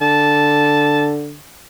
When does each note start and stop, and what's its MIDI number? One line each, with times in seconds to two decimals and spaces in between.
0.02 1.37 50
0.02 1.09 81